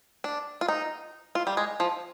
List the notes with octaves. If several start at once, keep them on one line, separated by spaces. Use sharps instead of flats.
D4
F4
D#4
F4
G3
G#3
F3